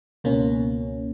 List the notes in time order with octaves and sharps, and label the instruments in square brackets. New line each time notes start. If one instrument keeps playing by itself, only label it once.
[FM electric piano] C#2 B2 A#3 C#4